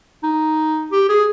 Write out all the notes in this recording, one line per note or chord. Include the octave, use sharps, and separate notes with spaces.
D#4
G4
G#4